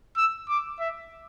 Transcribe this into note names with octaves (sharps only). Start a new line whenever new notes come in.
E6
D6
E5